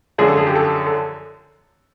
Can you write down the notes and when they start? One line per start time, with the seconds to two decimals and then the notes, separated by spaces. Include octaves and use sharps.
0.18 F#2 D3 F3 G#3 G#4
0.28 A4
0.37 G#4
0.47 G4
0.55 A4
0.87 A4